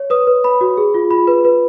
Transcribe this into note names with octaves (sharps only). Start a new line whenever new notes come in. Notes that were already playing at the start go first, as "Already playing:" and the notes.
Already playing: C#5
B4 D#6
B4
B4 B5
F#4
G#4
F4
F4 B5
B4
B4